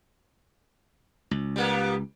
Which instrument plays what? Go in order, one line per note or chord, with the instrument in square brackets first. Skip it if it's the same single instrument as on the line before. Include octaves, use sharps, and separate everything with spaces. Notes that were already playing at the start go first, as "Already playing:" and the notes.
[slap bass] C#2
[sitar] G3 A#3 B3